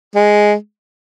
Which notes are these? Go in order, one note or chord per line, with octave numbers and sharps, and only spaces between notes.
G#3